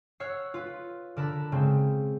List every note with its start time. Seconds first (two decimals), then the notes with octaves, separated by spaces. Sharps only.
0.20 C#5 F#5 E6 F6 C7
0.54 F4 B4
1.17 D3 A#4 A5 B5 A6
1.52 C#3 G#3 C4